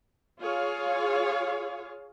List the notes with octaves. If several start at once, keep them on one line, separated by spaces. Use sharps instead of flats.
F4 G#4 C#5 F5